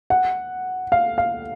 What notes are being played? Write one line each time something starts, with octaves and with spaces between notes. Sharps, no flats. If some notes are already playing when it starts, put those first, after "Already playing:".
F#5
F5
F5